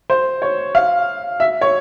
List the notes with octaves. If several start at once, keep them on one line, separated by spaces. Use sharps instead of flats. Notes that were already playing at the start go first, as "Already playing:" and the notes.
C5
C#5
F5
E5
C#5